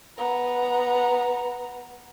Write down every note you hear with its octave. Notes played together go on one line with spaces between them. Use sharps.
B3 A#5